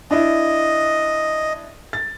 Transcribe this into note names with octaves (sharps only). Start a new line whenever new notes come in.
D4 E4 D#5
A6